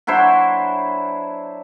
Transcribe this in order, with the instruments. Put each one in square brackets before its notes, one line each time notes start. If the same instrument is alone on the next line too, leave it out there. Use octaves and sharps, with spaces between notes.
[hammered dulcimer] F#3 D4 E4 C5